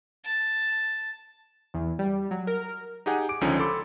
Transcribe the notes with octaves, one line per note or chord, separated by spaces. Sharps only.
A5
E2
G3
F#3
A#4
D#4 G4 G#4 F#5 G#5
D6 D7
C#2 D3 F3 C#4 D#4 C#5
A4 B5 C6 D6